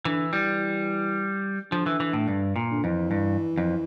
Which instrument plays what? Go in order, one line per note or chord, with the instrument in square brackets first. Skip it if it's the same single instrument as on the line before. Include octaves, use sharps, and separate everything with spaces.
[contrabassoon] D3 [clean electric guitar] E3
[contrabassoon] E3 [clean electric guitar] G3
[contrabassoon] D3 [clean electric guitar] F3
[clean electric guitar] E3
E3
A2
G2
A#2
[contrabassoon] D3
[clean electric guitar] F2 [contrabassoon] E3
[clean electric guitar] G2
F2